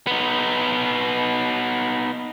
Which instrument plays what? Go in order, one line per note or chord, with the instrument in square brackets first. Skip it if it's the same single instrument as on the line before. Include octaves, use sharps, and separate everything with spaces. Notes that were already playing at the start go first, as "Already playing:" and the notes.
[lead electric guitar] B3 D#4